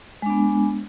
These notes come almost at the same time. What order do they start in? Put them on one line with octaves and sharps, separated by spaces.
G#3 D4 B3